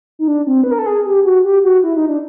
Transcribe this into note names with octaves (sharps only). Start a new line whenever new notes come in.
D#4
D4
C4
B4
A#4
A4
G#4
G4
F#4
G4
F#4
E4
D#4
D4